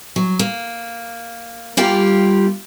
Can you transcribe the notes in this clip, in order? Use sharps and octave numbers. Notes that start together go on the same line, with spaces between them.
F#3
A#3
G3 A#3 F4 G4